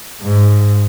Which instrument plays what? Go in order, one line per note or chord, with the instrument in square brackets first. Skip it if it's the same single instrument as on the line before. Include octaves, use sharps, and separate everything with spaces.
[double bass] G#2